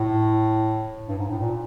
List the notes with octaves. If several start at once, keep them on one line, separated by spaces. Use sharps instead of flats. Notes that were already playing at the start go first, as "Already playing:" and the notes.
Already playing: A2
G2
G#2
A2
A#2